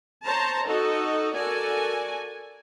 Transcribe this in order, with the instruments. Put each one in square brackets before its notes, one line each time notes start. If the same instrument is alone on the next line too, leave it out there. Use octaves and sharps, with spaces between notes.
[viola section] C5 C#5 A5 A#5
D#4 F#4 A4 D#5
F#4 A4 A#4 D5 G#5